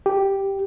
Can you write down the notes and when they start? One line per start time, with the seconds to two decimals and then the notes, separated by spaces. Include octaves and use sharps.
0.06 G4